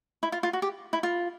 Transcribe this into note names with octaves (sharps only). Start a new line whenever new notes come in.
E4
F4
F4
F#4
G4
E4
F4